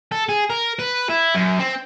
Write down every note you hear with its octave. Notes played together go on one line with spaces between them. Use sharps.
A4
G#4
A#4
B4
E4
F#2
C4